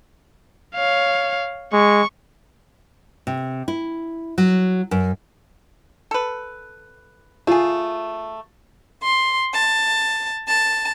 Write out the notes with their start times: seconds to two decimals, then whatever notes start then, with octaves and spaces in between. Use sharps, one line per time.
0.74 C#5 F5
1.73 G#3 C#6
3.27 C3
3.68 E4
4.38 F#3
4.91 F#2
6.11 A4 B4
7.47 A3 F4 G#4
9.03 C6
9.52 A5
10.46 A5